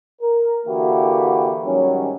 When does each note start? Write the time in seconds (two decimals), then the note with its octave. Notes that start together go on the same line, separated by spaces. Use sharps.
0.21 A#4
0.66 D3 E3 A#3 E4 F#4 G4
1.65 G#2 D#3 F#3 G3 C#4